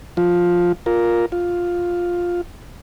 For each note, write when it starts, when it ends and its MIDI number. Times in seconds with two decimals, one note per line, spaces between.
0.17 0.72 53
0.17 0.72 65
0.86 1.26 65
0.86 1.26 70
1.32 2.41 65